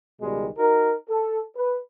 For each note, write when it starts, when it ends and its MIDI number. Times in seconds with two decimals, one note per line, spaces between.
0.21 0.47 37
0.21 0.47 47
0.21 0.47 51
0.21 0.47 55
0.21 0.47 56
0.58 0.93 63
0.58 0.93 66
0.58 0.93 70
1.08 1.38 69
1.56 1.76 71